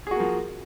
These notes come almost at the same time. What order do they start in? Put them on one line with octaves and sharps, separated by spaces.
G#4 F#4 A#3 F3